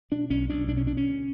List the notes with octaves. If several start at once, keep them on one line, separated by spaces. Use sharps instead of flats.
B2 D4
B1 C#4
B1 D4
B2 D4
C#4
B2 D4
C#4
D2